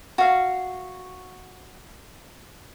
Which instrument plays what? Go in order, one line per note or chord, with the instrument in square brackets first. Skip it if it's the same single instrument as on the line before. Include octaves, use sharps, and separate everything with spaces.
[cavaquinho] F#4 F5